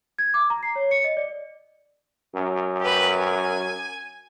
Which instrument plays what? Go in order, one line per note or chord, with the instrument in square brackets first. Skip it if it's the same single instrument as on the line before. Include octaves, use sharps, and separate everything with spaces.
[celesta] G#6
D6
A#5
C7
C#5
C#7
D#5
D5
[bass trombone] F#2
[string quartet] G4 B4
G#5